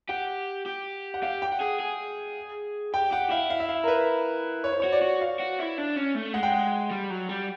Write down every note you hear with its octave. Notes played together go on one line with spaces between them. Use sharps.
G4 F#5
G4
F#5
G4 F5
G5
F#5
G#4
G#4
G4 G5
G4 F#5
E4 F5
F5
E5
F5
A#4
B4
C#5
C5
F#4 C#5
D5
F#4
F5
F#4
E4
D4
C#4
A3
G#3 F#5
G5
F#5
G3
F#3
G3